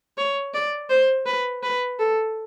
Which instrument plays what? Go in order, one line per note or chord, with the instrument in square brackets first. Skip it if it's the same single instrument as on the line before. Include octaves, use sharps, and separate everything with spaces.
[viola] C#5
D5
C5
B4
B4
A4